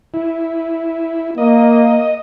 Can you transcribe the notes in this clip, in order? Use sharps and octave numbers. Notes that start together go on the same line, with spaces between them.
E4
A#3 D#5